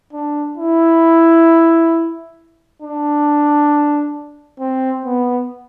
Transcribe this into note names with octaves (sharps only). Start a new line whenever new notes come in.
D4
E4
D4
C4
B3